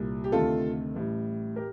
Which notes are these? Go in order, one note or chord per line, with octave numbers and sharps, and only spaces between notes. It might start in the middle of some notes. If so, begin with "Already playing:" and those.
Already playing: C2 A#2 G3
G4
D2 C3 D#3 A3 F4 A4
A1 A2 G3
G4 A#4